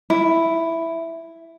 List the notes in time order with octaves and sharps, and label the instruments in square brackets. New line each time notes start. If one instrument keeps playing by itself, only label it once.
[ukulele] E4